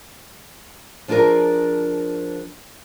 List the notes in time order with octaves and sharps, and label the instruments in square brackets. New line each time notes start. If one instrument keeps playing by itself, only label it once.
[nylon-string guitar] F3 D4 F4 G#4 A#4